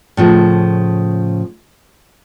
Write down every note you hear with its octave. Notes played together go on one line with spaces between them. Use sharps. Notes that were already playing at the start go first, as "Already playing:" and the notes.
A2 C#3 F3